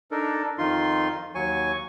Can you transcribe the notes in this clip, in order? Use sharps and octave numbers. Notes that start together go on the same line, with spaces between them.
D4 D#4 A4 A#4
F2 D#3 D#4 F4 C6
D#2 F#3 G#5 C#6